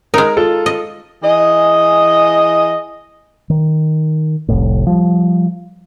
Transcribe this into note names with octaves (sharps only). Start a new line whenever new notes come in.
G#3 D#4 A#4
F4 A4
D#5
E3 G#4 D#5
D#3
F1 C2 A2
F3 G3